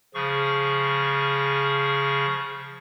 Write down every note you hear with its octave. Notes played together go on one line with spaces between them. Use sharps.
C#3 F3 G#4 C#6